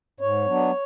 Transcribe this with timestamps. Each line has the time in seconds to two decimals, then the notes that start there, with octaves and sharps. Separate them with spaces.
0.20 G#2 C#5
0.46 F#3 B3 D4